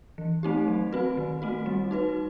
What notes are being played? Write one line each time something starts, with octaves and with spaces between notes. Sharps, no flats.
E3
A3 C4 D#4 G4
F#3
C4 F#4 B4
D#3
A3 C4 F#4
G3
D#4 F#4 B4